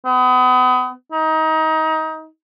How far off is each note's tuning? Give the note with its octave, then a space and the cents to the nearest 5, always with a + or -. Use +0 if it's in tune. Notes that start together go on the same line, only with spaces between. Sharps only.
B3 +35
D#4 +25